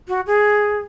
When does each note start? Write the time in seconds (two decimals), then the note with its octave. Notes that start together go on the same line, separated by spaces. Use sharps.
0.08 F#4
0.27 G#4